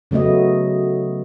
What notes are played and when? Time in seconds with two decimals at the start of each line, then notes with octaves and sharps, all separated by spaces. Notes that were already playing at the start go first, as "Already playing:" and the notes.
0.11 C#3 F#3 A3 B3 D#5